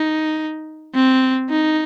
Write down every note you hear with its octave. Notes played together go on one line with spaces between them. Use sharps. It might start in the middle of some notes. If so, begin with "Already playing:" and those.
Already playing: D#4
C4
D#4